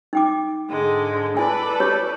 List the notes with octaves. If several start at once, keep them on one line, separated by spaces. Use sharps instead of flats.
D#4 G5 D6
G#2 D3 G#3
E4 A4 B4 D5 G#5
E4 G4 C#5